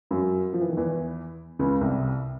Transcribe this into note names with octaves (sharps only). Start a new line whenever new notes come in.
F#2 F#3
F3
E3
D#3
E2 E3
C#2 C#3
C2 C3